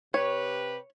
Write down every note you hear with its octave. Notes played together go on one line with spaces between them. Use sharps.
C3 G4 B4 C#5